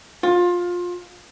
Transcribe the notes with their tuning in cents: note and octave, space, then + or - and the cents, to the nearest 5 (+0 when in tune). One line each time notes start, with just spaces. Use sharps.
F4 +20